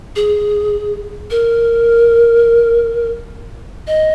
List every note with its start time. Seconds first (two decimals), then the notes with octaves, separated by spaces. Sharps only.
0.16 G#4
1.31 A#4
3.87 D#5